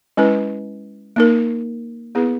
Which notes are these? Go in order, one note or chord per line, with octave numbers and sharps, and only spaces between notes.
G#3 C#4 E4 B4
A#3 D#4 A#4
B3 E4 G#4 B4